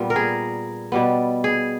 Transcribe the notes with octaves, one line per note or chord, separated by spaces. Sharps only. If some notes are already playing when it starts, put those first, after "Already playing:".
Already playing: A#2 G3 B3
A#4
G#4
B2 G3 B3
G#4